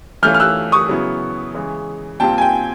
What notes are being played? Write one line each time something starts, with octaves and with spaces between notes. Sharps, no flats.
E3 A3 C#4 F4 F6 G6
F6
E6 F#6
C#6 D#6
C#3 F#3 B3 E4
C#3 E3 G#3
A#2 G3 C4 F4 G5 A5
G#5
G5